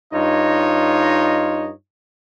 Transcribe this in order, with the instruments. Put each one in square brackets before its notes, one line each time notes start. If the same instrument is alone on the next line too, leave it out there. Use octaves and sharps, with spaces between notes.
[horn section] G2 D#4 F4 C#5 D#5